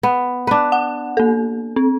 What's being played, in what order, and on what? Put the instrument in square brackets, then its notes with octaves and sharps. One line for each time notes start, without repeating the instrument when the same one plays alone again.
[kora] B3
D4 B4
[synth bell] F#5
A#3 A4
C4